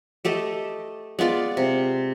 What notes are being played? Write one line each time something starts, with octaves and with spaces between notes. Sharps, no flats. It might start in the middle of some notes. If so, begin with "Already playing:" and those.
A3 G4 A4 D#5
G#3 B3 F4 D5
C3